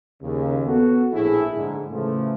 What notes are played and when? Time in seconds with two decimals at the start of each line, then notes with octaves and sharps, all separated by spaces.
0.21 D#2 C#3
0.66 B3 F#4 A4
1.12 A#1 A2 E4 G#4
1.55 G#2 D3
1.91 A2 C#3 E3 F3 A3